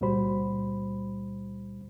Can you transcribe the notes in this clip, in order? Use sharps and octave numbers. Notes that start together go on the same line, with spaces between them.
C#2 A#2 G3 F#4 C5 B5